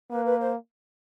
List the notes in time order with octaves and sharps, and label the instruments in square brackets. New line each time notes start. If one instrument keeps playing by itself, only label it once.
[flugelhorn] A#3 [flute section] B4
[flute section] B4
C5